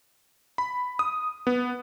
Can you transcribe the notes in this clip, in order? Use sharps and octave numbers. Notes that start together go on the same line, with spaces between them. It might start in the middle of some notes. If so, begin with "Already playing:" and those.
B5
D#6
B3